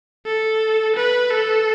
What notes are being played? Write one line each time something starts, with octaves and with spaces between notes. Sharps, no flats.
A4
B4
A4